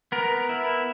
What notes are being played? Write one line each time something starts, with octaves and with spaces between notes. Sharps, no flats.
B3 A#4
E4